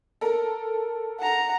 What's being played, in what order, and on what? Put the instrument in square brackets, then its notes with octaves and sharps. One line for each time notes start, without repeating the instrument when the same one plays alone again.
[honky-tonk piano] A4 A#4
[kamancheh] F#5 A#5